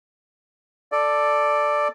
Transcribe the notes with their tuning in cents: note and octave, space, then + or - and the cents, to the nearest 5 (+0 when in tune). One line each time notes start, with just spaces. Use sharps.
A4 +0 D5 +5